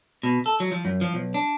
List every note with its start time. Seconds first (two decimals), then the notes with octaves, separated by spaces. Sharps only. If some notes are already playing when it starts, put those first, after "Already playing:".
0.23 B2
0.46 A4
0.60 F#3
0.72 F3
0.85 F#2
1.01 F3
1.14 B1
1.34 D4